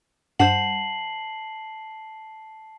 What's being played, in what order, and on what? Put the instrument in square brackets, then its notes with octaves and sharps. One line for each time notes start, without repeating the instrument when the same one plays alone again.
[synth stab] G2 [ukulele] C5 F#5 [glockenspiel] A5 C7 F#7